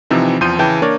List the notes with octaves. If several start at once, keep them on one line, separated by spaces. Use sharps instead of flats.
C3 E3 F3 C4 D#4
E2 F3 C4 C6 G6 D#7
C#3 E3 G5 A5 G6
A#3 D4 A#4 C#5 D5